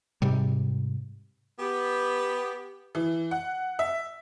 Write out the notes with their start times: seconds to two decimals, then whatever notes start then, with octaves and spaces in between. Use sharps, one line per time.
0.22 G#2 C3 G3
1.59 B3 G4
2.95 E3
3.31 F#5
3.79 E5